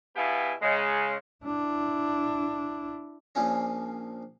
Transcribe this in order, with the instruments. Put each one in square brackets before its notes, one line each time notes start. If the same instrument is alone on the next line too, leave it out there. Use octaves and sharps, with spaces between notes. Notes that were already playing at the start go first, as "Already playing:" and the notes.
[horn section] B2 B3 E4 G4 F5 G#5
C#3 G#3
[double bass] D4 E4
[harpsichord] A#1 A#2 F3 C#4 C#5